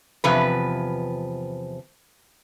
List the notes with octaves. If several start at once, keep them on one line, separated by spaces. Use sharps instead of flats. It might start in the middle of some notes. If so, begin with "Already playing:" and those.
E2 C3 F3 B4